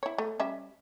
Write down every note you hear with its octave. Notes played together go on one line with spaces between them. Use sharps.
E4 C#5
A3
G3 C#4 E5